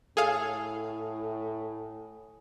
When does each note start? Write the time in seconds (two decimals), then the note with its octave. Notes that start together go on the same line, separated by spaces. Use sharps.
0.17 A2 G#4 A4 C#5 F5 G#5 D#6